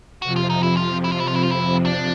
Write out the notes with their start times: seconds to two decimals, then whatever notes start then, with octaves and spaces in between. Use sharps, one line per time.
0.22 F2 C3 F3 F#4
0.36 F4
0.50 D#4
0.63 E4
0.77 F4
1.04 E4
1.12 F4
1.20 E4
1.28 F4
1.36 E4
1.43 F4
1.51 E4
1.86 D4